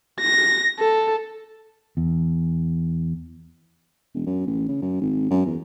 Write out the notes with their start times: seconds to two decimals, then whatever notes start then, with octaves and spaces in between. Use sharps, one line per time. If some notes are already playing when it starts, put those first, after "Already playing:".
0.21 A#6
0.79 A4
1.97 E2
4.14 E1
4.26 F#2
4.46 A1
4.68 C#3
4.82 F#2
5.01 G#1
5.30 F#2
5.46 E2